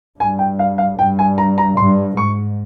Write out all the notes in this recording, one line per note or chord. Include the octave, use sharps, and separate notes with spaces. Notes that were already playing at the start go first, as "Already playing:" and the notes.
G2 G#5
G5
F5
F5
G2 G5
G#5
A#5
A#5
G2 C6
G#2 C#6